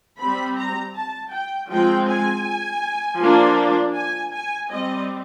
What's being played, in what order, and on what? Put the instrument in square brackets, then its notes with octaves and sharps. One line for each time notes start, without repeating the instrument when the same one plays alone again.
[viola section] G3 C4 B5
A#5
A5
G5
F3 G#3 C4 G5
G#5
F3 A#3 D4
G#5
G#5
G3 C4 D#5